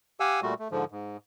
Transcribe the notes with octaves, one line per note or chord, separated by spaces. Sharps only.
G4 F5 F#5 G#5 E6
A#2 G3 A3 F#4
A3
G#2 D3 F3
G#2